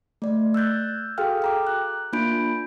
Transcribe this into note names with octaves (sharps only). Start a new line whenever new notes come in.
A3 D5
E6 F#6 G6 A6
F#4 G#4 A4 F5 G5 F6
G5 A#5 D6
F#6
A#3 D4 F4 B5 G6 D7